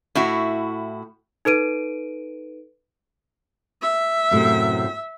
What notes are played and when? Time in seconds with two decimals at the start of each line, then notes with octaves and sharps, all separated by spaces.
0.15 A2 E4 F#4
1.45 D#4 A4 B4 D7 D#7
3.82 E5
4.31 F#2 A2 C3